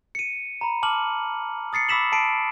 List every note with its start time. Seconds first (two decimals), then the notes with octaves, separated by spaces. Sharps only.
0.15 C#7 D#7
0.61 A#5 B5
0.83 A5 D6 F6 F#7
1.73 D#6 A6 C7 C#7
1.89 B5 D6 E6 B6 E7 F#7
2.12 A5 C7 D7